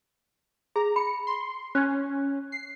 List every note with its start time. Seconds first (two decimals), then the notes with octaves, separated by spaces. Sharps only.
0.76 G#4 A#5
0.96 B5 C#7
1.27 C6
1.75 C#4 F#6 G#6
2.52 C7